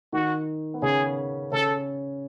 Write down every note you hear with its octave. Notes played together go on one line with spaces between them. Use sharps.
D#3 D#4 F#4
B3
C#3 C#4 G#4
C#3 C#4 A4